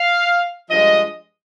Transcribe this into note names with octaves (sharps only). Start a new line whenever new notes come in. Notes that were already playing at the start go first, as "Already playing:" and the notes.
Already playing: F5
G2 F3 G#3 D#5